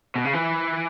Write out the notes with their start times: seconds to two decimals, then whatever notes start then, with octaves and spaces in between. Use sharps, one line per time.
0.15 B2
0.25 C#3
0.33 E3